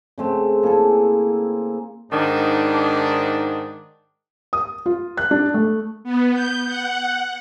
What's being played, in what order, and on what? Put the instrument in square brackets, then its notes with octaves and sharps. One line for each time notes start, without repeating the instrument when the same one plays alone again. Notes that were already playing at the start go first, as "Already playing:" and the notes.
[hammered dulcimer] C#3 A3 C4
A#3 E4 G#4 A4
[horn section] G#2 D#3 D4
[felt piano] D#6
F4
F#6
D4
A3
[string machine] B3
G6
F#5